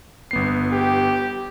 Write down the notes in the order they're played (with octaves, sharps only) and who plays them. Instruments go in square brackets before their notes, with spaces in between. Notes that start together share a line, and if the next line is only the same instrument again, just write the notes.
[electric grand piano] G1 B3 C7
[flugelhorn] G4